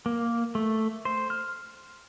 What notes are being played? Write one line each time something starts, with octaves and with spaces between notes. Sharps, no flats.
A#3
A3
C5
F6